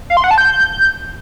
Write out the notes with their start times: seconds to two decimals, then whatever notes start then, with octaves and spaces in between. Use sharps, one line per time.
0.10 F5
0.17 C6
0.24 F#5
0.31 A5
0.38 G6